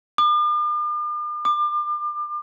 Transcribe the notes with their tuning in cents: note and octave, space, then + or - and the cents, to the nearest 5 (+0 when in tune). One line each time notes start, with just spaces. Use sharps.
D6 +45
D6 +35